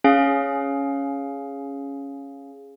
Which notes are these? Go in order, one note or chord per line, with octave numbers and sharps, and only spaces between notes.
C#4 G#4 F5